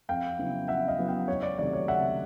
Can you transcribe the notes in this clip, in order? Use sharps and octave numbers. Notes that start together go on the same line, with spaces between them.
F2 F5 G5
C#3 F#3 B3 E4
F2 E5 F#5
D#5 F5
C#3 F#3 B3 E4
F5 G5
C#2 C#5
D5
C3 D#3 F#3 A3 D5
C#5
C#2 E5 F#5